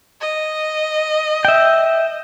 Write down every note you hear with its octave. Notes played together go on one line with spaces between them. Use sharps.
D#5
E5 G5